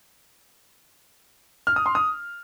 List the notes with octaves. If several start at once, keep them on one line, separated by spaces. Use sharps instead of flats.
F6
D#6
C6
D#6